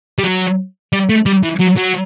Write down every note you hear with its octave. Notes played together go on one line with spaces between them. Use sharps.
G3
F#3
G3
A3
G3
E3
F#3
F#3